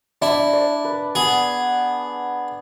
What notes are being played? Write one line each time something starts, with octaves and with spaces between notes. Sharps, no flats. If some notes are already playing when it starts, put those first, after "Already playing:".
D4 E4
D5
B4
B3 G#4